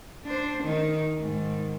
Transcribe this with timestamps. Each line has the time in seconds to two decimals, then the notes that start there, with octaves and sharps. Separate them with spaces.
0.24 D4 C5
0.63 D#3 D#4
1.20 G#2 D#3